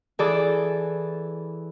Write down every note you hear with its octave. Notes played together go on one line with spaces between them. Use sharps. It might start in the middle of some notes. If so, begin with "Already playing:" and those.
E3 G#4 A4 D5